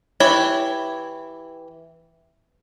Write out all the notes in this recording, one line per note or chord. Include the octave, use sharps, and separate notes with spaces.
E3 E4 G4 C#5 B5